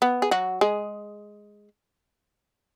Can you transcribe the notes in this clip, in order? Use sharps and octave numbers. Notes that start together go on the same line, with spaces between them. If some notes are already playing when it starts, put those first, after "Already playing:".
B3
G#4
F#3 F#4
G#3 G#4